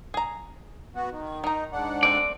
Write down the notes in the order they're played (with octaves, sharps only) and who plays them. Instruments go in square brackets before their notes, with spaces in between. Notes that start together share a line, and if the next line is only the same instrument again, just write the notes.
[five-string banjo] G#4 A#5
[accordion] B3 F#4
D#3
[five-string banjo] D#3 A#5 [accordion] D#4
[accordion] G#2 D4 F#5
[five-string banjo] A3 C4 [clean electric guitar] D5